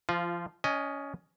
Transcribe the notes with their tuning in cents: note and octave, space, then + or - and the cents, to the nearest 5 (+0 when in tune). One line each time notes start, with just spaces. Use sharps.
F3 -20 F4 +0
C#4 +20 D#5 +0 G#5 -40